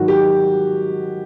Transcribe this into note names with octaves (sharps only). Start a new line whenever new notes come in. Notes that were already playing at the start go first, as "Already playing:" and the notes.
Already playing: G#2 D#3 F#3 F#4
G4